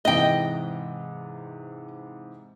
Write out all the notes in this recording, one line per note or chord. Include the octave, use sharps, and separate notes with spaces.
G#2 C3 E3 D#5 G5